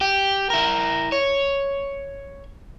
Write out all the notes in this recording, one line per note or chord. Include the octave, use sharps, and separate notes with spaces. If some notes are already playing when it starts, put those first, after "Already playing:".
G4
E4 A#4
C#5